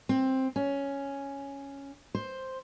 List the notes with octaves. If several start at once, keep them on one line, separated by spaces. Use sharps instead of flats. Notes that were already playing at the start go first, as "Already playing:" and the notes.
C4
C#4
C5